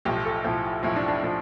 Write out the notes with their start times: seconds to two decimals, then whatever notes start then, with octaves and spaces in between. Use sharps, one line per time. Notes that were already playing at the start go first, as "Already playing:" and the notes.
0.05 B1 A2 F3 G4
0.25 A4
0.44 B1 A2 F3 E4
0.83 B1 A2 F3 E4
0.96 D4
1.08 D4
1.23 A2 F3